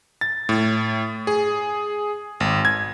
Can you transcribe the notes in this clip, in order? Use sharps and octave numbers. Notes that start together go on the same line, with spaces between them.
A6
A2
G#4
G#1
G#6